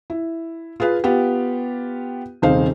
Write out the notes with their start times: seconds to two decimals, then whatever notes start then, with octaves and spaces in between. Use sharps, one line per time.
0.10 E4
0.80 F4 G#4 B4 F5
1.04 B3 F4 G4
2.42 D#1 C3 D#4 G#4 C5 F5